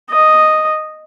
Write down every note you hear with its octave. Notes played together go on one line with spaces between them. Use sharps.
D#5